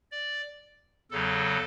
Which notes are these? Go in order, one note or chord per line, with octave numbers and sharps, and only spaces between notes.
D5
E2 C#3 F#3 A4